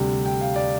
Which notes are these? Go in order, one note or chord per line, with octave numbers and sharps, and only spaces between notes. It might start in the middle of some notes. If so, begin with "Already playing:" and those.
Already playing: D2 C3 G3
G5
F5
D5